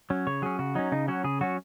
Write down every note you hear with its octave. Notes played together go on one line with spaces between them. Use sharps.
F#3 C#4
C#3 C#5
F#3 C#4 G#4
C#3 F#4
F#3 C#4 D#4
C#3 D#4
F#3 C#4 F#4
C#3 G#4
F#3 C#4 F#4